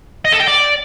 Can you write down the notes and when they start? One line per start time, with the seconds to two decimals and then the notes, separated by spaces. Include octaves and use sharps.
0.25 D#5
0.32 A4
0.40 G5
0.47 D5